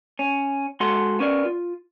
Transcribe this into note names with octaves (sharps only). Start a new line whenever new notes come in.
C#4
G#3 F#4 A4 F#5 C6
B3 C#4 A#4 D5
F4